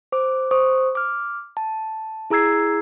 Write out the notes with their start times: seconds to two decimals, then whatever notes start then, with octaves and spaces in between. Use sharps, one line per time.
0.12 C5 D6
0.51 C5 C#6 D#6
0.95 D6 F6
1.57 A5
2.30 E4 G#4 A#5 E6 G#6 C7